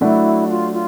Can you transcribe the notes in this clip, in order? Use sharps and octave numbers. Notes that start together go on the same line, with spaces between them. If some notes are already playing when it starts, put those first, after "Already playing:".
F#3 A3 D4 E4 F#4
F4
F4